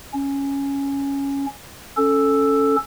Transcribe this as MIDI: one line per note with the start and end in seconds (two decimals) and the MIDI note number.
0.13 1.46 61
1.97 2.76 61
1.97 2.76 69